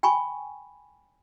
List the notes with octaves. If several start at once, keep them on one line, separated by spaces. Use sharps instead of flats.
G5 G#5 B5 C#6